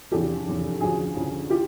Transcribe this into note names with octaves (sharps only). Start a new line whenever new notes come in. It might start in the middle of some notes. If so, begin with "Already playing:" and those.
F1 E2 C#3 G4 A4
F1 E2 C#3
D2 C#3 F3 F#4 G#4
D2 C#3 F3
F4 G4